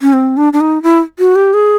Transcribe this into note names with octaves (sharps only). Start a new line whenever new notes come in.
C#4
C4
D4
D4
D#4
E4
F#4
G4
G#4